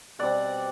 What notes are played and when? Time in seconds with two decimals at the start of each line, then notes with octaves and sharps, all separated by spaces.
0.19 B2 G3 C4 D5 F#5